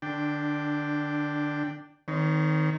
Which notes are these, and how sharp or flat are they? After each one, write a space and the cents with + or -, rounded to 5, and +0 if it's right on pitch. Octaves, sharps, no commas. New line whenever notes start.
D3 +25 D4 +0 G5 +0
D#3 +0 C4 -30 C#5 +30